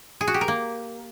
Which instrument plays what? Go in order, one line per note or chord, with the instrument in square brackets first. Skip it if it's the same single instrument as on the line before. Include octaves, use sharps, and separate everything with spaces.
[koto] G#4
F#4
G4
A#4
A#3